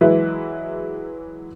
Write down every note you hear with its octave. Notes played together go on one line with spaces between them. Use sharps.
E3 F#3 G#3 E4 B4 E5